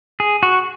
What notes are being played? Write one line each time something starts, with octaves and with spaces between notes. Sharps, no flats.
G#4
F#4